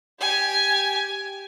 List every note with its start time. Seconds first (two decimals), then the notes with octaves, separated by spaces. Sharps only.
0.20 G4 G#5